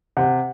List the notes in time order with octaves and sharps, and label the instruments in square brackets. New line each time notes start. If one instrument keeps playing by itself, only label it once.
[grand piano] C3 [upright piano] F#5